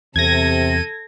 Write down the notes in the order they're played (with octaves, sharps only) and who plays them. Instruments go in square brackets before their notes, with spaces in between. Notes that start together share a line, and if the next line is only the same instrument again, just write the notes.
[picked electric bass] E2 [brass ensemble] C3 [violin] A4 D#7 [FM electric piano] G#6 A#6